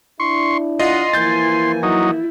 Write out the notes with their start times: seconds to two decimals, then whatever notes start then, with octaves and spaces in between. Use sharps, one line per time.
0.20 D4 E4 C6 C#6
0.80 F4 D#5 F#5 C6
1.13 E3 F3 A#3 E4 G#5 G6 A6
1.83 F#3 D#4 E4